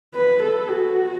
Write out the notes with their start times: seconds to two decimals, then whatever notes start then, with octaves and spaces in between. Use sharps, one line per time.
0.15 B4
0.42 A4
0.70 F#4